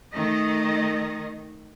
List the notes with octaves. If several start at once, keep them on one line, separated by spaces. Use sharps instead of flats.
D#3 A3 D#5